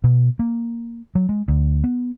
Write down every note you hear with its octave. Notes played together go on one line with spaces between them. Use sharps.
B2
A#3
F#3
G#3
D2
B3